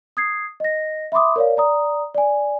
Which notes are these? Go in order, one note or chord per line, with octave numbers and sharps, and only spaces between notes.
D#6 G#6 C7
D#5 A#6
E5 B5 C6 D6 D#6
A#4 C#5 D5 F5
D5 A#5 D#6
D5 G#5